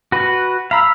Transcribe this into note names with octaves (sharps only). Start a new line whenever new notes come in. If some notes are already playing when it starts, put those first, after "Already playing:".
F#4 B4
F5 A#5 B5 E6